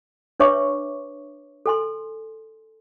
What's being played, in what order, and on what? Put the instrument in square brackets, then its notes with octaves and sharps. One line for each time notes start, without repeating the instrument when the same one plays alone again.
[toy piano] D4 B4 C#5 E5 C#6 D6
A4 G#5 C6